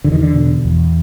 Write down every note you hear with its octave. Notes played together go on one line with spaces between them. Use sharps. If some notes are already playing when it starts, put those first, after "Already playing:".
E2 D3
D#3
D3
B2
E2